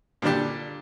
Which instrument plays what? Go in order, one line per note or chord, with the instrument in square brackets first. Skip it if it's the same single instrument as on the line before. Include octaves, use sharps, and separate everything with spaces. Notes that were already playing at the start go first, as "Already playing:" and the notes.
[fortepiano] A#2 D3 G3 D4 G4